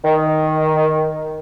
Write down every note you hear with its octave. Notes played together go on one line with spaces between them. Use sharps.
D#3